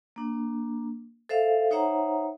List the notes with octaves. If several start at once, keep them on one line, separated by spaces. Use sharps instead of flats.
A#3 D4
A4 C5 E5 F5
D#4 C5 C#5 E5 F#5 A#5